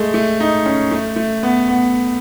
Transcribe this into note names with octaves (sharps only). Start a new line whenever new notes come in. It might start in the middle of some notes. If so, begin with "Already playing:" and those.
Already playing: G#3 A3
A3
D#4
C#4
A3
A3
B3
B3